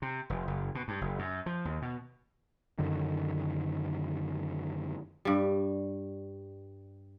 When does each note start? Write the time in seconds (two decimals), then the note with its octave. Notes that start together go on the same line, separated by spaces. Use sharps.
0.02 C3
0.30 F1
0.47 F#1
0.75 B2
0.88 G2
1.01 F#1
1.19 F#2
1.46 F3
1.65 D#2
1.82 B2
2.79 F#2 D3 D#3
5.25 G2 G3